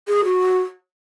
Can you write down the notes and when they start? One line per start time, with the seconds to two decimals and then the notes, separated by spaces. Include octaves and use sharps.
0.08 G#4
0.24 F#4